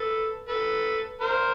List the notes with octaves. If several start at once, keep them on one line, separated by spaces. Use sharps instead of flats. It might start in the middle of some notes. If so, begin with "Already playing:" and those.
Already playing: A4 B4
A4 B4
A#4 C5